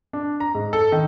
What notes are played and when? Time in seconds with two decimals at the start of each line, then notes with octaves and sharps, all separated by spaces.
0.13 D4
0.40 A#5
0.55 G#2
0.73 A4
0.92 D#3